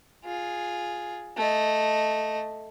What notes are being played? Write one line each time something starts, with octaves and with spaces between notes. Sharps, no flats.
F4 G#4
A3 D#5